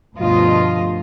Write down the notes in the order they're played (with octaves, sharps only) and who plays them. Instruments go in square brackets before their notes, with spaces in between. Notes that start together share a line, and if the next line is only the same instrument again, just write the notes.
[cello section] D2 G2 B2 F3 F4 D#5